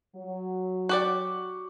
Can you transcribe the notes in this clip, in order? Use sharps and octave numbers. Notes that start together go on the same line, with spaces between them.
F#3
F#4 G4 D5